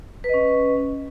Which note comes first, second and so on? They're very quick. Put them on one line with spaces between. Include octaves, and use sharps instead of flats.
B4 D#5 C#4